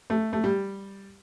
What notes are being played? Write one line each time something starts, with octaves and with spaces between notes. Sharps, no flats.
A3
A3
G3